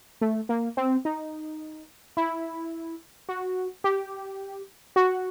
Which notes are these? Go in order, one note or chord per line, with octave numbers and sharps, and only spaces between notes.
A3
A#3
C4
D#4
E4
F#4
G4
F#4